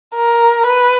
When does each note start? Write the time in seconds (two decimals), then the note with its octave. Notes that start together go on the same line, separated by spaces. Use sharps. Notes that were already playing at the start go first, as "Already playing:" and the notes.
0.15 A#4
0.66 B4